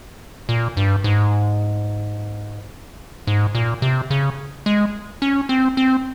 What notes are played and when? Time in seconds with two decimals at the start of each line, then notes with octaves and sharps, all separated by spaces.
0.49 A#2
0.77 G2
1.04 G#2
3.27 G#2
3.55 A#2
3.82 C3
4.10 C#3
4.66 G#3
5.22 C#4
5.49 C4
5.77 C4